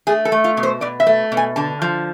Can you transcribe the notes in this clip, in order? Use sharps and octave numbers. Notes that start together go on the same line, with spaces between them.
A3 G#4
A4
A3
F4
B2
C5
B2 D5
E5
A3
B2
G#5
D3 A5
F3